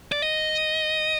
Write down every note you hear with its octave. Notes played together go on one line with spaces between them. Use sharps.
D5
D#5